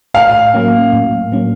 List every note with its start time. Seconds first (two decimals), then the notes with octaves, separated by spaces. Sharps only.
0.14 A2 F5
0.54 F#3 A#3 C#4
0.93 A2
1.32 F#3 A#3 C#4